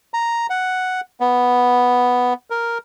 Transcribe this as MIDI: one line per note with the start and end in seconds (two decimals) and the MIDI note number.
0.14 0.47 82
0.50 1.01 78
1.20 2.33 59
2.50 2.78 70